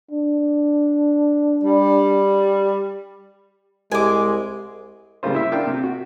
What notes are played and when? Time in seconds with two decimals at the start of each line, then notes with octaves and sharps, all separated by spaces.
0.11 D4
1.63 G3
3.91 C2 G#3 G#5 D6
5.23 C#3 G3 G#3 A#3 F4 C5
5.34 E4 E5
5.52 D4 E4 F4 A#4 F5 G5
5.67 C3
5.83 F#4